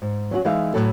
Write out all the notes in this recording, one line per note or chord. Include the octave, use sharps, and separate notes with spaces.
G#2
F#3 C#4 E4 F#4
E3 G#3 D#4 G#4 E5 F5
A2 F#3 E4 F#4 A4